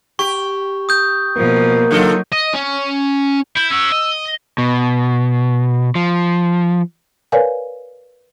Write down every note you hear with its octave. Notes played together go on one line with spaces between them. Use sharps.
G4 C#6
D#6 G6
B2 F3 A#3
C#3 F#3 D#4 F4 A4
D#5
C#4
E4 G6
C#4 F#4 E6
D#5
B2
F3
A#4 B4 C#5 D5 F5 G#5